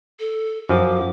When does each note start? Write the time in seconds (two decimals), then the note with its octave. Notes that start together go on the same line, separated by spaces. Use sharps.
0.19 A4
0.69 F#2 F3 D6